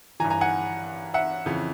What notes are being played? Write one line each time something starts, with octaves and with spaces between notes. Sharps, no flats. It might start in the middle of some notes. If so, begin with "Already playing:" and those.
G2 E3 G#5 A#5
G#5 A#5
F#5 G#5
E5 F#5
F2 C#3 E3